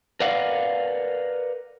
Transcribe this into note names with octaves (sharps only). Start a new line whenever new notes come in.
A#4 B4 D5 F5 F#5